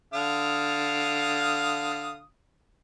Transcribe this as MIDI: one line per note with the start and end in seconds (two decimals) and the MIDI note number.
0.14 2.21 50
0.14 2.21 77
0.14 2.21 87